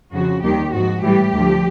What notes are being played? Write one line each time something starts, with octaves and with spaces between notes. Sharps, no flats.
F2 C#3 F3 F#4
D#2 D#3 G3 G4
G#2 F3 F#4
A2 E3 G3 G4
D2 D3 F3